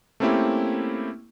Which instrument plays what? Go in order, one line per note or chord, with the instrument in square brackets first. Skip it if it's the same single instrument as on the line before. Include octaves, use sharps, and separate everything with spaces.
[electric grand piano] A3 A#3 C4 C#4 E4 G4